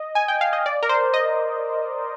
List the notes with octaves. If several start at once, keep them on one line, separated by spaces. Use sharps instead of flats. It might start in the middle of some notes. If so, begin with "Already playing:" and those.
Already playing: D#5
G#5
G5
F5
D#5
D5
A#4
C5
D#5